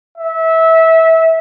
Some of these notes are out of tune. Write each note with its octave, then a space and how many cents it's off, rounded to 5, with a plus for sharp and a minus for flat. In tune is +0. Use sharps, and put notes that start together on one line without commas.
E5 -20